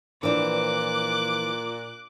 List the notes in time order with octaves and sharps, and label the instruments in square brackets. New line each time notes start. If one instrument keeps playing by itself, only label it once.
[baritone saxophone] A#2 [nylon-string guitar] E3 F3 C4 [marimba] D4 D5 [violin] D6 F#6